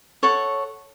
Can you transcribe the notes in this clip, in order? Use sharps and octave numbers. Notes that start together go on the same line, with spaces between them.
A4 C#5 F#5 C#6